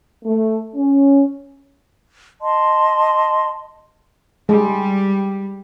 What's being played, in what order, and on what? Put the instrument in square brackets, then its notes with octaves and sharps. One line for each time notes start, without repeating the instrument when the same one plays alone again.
[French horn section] A3
C#4
[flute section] D#5 A5 C6
[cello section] G3 [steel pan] G#3